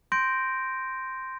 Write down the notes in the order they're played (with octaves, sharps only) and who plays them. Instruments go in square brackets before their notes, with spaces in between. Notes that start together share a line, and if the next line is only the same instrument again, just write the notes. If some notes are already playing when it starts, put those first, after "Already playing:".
[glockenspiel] C6 G6 A#6 D7